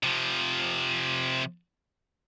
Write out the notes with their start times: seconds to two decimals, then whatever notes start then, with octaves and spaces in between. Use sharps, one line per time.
0.03 C3 F3